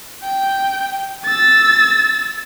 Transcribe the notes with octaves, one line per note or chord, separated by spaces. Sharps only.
G5
E6 A6